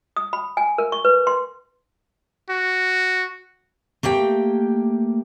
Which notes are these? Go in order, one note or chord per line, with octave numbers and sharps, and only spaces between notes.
D#6
B5
G#5
A#4
C#6
B4
C6
F#4
A3 A#3 G4 G5